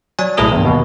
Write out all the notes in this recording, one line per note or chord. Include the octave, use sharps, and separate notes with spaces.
F#3 D5 G#5
B1 A2 G#3 G#4 A#4 D#6
E2 G2
D#2 B2